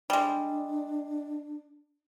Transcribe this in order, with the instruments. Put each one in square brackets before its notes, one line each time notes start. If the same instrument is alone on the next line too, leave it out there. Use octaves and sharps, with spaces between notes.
[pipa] G3 G#3 [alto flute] D4